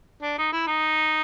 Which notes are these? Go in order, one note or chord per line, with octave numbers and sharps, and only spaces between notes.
D4
D#4
E4
D#4